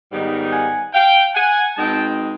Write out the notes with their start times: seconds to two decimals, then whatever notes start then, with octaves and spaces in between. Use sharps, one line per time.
0.11 G#2 D#3 G3 B3 D#4
0.52 F#5 G#5
0.94 F5 G5
1.35 F#5 G#5
1.76 B2 G#3 C4 D#4 G5 A5